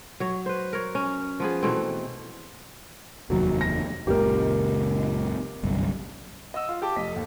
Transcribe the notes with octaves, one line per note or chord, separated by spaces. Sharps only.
F#3 C#5
B4 C5
A#4 C#5
C#4
F3 B3 G#4
B2 E3 A3 C4
F1 D#2 F#3
A#6
F#1 C#2 A#2 G4 A#4
G1 C2 F#2
D#5 F#5 E6
F4
G4 G5 A5 D6
F1 D#5 B6
D#2 A4